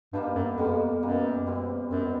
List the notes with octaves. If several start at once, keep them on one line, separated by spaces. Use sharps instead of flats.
G2 B2 G3 A#3
F#2
F2 B2 G3 A#3
F#2 B2 G3 A#3
B2 G3 C4
F#2 B2 G3 C4